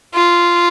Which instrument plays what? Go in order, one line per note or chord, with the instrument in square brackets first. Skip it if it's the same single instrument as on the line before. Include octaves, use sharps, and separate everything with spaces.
[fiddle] F4